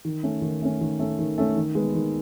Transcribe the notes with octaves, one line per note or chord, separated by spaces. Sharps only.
D#3
A3 C#4
D#3
A3 C#4
D#3
A3 C#4
D#3
A3 C#4
D#3
G#3 B3
D#3